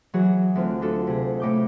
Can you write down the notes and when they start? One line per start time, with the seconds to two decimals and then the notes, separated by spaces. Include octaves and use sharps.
0.14 E3 F#3 F#4 G#4
0.56 D2 C4 F4
0.82 D4 F4 F#4 A4
1.07 C3 G#4
1.40 A2 D6 G6